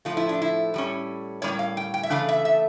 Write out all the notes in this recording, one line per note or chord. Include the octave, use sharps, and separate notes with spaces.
A2 F3 A3 F4
E4
D4
E4
A2 G3 C#4
A2 G3 A#3 C#4 C#5
F5
G5
G5
E5
C#3 E3 A3 D4 F5
E5
E5